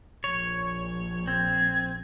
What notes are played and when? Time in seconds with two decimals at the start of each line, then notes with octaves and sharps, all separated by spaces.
0.24 A#1 C#5
1.28 C4 G#6